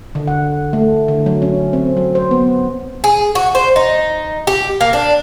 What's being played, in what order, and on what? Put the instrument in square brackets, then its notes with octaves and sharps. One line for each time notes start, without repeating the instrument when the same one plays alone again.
[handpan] D3
F#5
A3
D3
F#3
C#4
C4
F#3
C5
B3
[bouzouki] G#4
F#4
C5
D#4
G4
A#3
D4